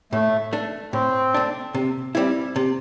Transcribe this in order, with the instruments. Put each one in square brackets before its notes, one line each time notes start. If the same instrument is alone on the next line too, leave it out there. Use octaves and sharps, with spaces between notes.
[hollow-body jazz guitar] A2 [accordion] A3
[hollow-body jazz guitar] A3 D4
[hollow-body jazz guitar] A2 [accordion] C4
[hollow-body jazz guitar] A3 D4
C3
G3 C4 E4
C3